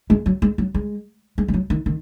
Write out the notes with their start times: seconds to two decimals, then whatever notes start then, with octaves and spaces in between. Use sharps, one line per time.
0.10 G#3
0.26 F#3
0.42 G#3
0.58 F#3
0.74 G#3
1.38 G#3
1.48 G#3
1.54 F#3
1.70 D#3
1.86 D#3